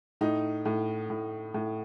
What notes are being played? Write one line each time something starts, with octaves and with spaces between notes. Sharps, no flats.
A2 D#4
A2
A2
A2